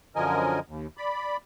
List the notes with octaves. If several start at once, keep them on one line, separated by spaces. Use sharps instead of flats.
F#2 D3 F3 A#4 D#5 G#5
D#2
D5 B5